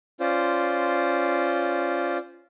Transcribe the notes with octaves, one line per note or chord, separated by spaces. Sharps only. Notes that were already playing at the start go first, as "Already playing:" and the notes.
C#4 F4 C5 D5